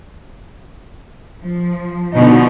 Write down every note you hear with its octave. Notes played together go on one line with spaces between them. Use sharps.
F3
B2 D3 F3 D#4